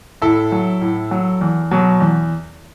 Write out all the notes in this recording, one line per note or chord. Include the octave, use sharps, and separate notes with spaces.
A2 E4 A4
F#3
A2
F#3
E2
B2 F#3
E2